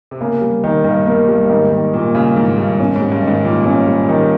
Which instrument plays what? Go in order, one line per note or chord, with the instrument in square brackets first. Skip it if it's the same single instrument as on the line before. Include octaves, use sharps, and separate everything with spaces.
[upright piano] C3
[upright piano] C#3 [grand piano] A#3
[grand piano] G3
D#3
[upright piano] G2 [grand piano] D#3
[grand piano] A#3
G3
[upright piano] G#2 [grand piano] D#3
[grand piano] D#3
[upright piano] A#2 [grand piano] A#3
[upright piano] C#3 [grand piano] G3
[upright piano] G#2 [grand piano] D#3
[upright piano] G2 [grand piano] D#3
[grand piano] C#4
[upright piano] G#2
[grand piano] G3
[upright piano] G2
[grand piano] D#3
[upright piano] G#2
[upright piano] A#2 [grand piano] D#3
[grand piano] C#4
G3
D#3